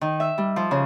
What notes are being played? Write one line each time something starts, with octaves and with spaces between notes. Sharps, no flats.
D#3
E5
G3
F3
C#3